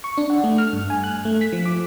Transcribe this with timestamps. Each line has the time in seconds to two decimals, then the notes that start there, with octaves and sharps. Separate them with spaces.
0.04 C#6
0.18 D4
0.30 F#5
0.44 A3
0.58 F6
0.73 G2
0.90 G#5
1.04 F#6
1.25 A3
1.41 B6
1.52 F3
1.66 D6